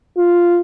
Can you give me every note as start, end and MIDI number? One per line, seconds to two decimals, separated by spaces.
0.18 0.61 65